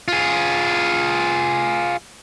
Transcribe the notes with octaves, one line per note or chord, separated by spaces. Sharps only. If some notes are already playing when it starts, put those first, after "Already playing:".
F4 G#4